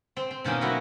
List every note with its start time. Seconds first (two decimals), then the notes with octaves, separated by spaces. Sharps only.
0.17 C4
0.31 C4
0.44 B2 D#3 A#3 C#4 D#4
0.61 D#3 F#3 E4 F#4